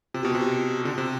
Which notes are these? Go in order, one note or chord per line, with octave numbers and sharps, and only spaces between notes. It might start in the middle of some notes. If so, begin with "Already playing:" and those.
C3 F4
B2 G4
C3 F4
G4
D3 F4
C3